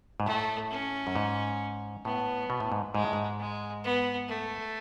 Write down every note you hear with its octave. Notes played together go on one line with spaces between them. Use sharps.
G#2
A2 A3
C#4
F#2
G#2
A2 B3
B2
A2
G#2
G#2 G#3
A2
G#2
G#3
B3
A3